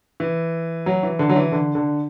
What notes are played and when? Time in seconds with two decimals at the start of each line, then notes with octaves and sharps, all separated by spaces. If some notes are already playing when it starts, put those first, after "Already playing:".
0.20 E3
0.86 F#3
1.03 E3
1.19 D3
1.29 F#3
1.36 E3
1.52 D3
1.75 D3